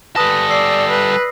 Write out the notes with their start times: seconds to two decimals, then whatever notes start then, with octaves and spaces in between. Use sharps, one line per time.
0.16 G3 A4 B4 D#6 A#6
0.50 D5 E6 C7
0.90 B4